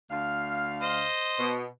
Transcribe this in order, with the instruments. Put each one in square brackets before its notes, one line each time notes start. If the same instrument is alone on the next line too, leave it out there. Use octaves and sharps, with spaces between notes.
[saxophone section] D2 F5
[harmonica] C5 D#5
[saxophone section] B2